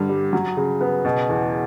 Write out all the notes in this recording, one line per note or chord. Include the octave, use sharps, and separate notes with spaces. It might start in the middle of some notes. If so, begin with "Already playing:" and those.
Already playing: G2 D3
G3
F#3
C#3
B3
B2
E2